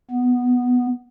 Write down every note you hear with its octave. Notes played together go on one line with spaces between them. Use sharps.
B3